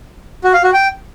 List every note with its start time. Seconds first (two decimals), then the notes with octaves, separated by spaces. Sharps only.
0.44 F#4
0.54 F5
0.64 F#4
0.73 G5